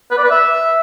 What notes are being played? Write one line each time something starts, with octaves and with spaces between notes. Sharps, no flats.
B4
D5
B4
E5